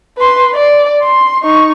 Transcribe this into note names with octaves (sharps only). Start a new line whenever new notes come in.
B4 C6
D5
C6
D#4 C#6